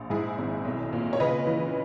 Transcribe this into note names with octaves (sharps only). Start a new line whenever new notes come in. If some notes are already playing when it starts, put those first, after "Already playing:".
Already playing: A#1
G#2 E4 G#4
G#1
B1
A#2
C#5
C#3 B4 D#5
E3